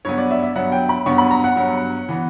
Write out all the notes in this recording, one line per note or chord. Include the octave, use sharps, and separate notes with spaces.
G2 F#3 B3 C#5
D5
E5
E5
G2 F#3 B3 F#5
G5
B5
G2 F#3 B3 C#6
B5
A#5
F#5
G2 F#3 B3
E3 B3